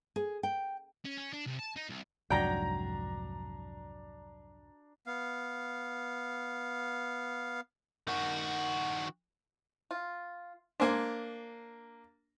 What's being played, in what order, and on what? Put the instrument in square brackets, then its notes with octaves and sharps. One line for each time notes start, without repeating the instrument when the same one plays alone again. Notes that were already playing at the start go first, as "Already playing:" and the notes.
[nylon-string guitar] G#4
G5
[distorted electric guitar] C#4
C#4
D4
C2
A5
D#4
C2
[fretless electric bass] C2 F2 G#2 [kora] F#3 G5 [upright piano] D4 A#5 A#6
[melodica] B3 F5
[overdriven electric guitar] D#3 F#4
[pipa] F4
[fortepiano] A#3 D4 [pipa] C5 G#5